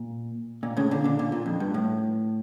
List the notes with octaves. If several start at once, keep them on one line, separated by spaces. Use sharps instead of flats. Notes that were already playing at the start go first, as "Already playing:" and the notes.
Already playing: A#2
A#2
A2 C#3
A#2 D3
A#2 D3
A#2 D3
A#2
F2
G2
A2